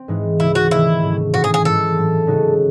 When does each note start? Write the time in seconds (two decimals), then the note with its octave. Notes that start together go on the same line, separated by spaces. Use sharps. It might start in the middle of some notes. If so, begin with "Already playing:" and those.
Already playing: C4
0.08 G#2 E3 G#3 D#4
0.40 C#2 C#3 E3 E4
0.55 F#4
0.71 C3 D#3 A3 C4 E4
1.02 G#2 F#3 A3 C#4
1.34 A2 E3 C4 E4 F#4
1.44 G#4
1.54 G#4
1.65 G#2 E3 G#3 A4
1.96 A2 F#3 C4
2.27 C#3 G#3 D#4 F#4